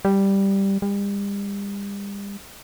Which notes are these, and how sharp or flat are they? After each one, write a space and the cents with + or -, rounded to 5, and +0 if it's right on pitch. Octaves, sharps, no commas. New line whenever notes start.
G3 +0
G3 +40